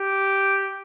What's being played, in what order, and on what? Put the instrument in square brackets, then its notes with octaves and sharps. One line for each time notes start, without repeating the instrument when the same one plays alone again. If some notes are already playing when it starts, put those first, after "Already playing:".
Already playing: [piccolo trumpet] G4